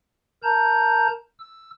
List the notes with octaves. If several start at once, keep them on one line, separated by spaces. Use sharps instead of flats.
A#4 A5 A#5 G6
E6